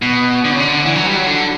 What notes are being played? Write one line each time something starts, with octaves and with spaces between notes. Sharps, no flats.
B2
D3
C#3
D3
E3
F#3
G3
F#3
D3